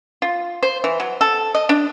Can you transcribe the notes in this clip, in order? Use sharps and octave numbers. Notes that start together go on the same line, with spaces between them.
F4
C5
E3
F#3
A4
D#5
D4